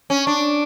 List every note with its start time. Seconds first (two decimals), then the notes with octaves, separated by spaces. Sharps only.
0.10 C#4
0.27 D4